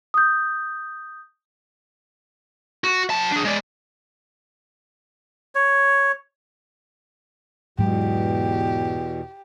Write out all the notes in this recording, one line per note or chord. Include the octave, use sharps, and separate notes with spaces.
D#6 G6
F#4
F#3 A5
D4 G#4
G#3 D5
C#5
E2 G#2 B2 F#3 G#3 G4